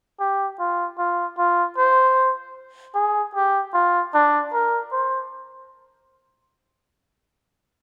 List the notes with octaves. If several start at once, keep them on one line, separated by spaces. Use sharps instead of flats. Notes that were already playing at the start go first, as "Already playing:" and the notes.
G4
F4
F4
F4
C5
G#4
G4
F4
D4
A#4
C5